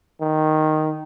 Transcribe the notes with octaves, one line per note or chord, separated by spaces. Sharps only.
D#3